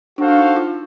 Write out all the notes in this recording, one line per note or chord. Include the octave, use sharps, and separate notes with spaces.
D4 F#4 A4 C5 F5
D4
D#4
F4